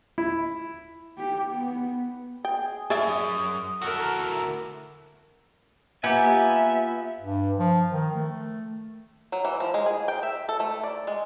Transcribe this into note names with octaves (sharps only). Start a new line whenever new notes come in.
E4
G4
B3
G#4 G5
F#2 G#4 D5 E5 D#6
D2 E4 F#4 A4 A#4
A#3 B3 F4 G4 E5 G#5
G2
F3
D#3
A3
F#3
E3
F3
G#3
G#4
G5
E5
A4
A3
D5
G#3